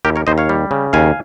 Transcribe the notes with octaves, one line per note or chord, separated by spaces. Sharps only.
D#2 G4 A#4
A#4 C#5
D#2 C5 D#5
C#5 F5
G3
C#3
D#2 F5 G#5